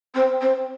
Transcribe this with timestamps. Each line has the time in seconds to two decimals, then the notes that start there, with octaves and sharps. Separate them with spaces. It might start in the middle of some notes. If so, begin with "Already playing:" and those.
0.14 C4
0.41 C4